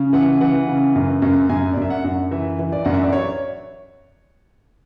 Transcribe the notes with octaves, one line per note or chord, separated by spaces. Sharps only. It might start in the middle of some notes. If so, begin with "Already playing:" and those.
Already playing: C#3
E3 F#5
E3 F#5
C#3
F#2
F#2
F#2 G#5
D5
F#2 E5
F#5
F#2
E3 E5
E3
D5
F#2 F#5
E5
D5
C#5